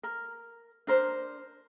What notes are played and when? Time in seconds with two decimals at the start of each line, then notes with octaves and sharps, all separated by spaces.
0.03 A#4
0.87 D4 A#4 C5